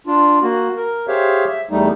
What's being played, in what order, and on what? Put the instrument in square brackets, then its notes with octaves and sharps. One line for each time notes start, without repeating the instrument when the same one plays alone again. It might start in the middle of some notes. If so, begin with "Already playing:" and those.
[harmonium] D4 F4
A#3 F#4
A#4
G4 G#4 C5 C#5 E5 F5
E5
E2 G3 A3 D#4